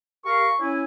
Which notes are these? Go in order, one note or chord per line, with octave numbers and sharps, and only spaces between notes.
G4 A#4 F5 C#6
C#4 E4 G#5